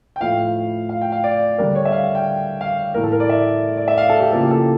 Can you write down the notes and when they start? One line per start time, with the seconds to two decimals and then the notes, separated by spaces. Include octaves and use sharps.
0.16 G5
0.20 A2 F3 A3 E4 F5
0.89 F5
1.01 G5
1.12 F5
1.24 D5
1.58 D3 G3 D4 A#4
1.75 C#5
1.85 E5
1.92 F5
2.04 F5
2.15 G5
2.61 F5
2.94 A2 E3 A3 A#4
3.03 A4
3.12 A#4
3.20 D5
3.29 E5
3.77 D5
3.88 E5
3.98 F5
4.09 A4
4.20 G4
4.31 C#3 F3 A#3 E4 A4
4.42 G4
4.51 A4